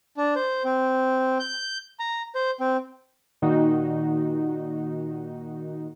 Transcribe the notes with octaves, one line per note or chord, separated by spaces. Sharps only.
D4
C5
C4
G6
A#5
C5
C4
A#2 D#3 D#4 F#4